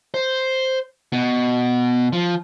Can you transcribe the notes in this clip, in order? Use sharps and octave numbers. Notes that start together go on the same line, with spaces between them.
C5
B2
F3